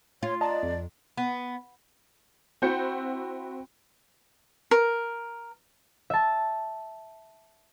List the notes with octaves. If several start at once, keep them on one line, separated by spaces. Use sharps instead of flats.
F4 C#5
D5 D#5 A5 A#5
F2
B3
C4 E4 F#4 G6 C#7
A#4
E5 A5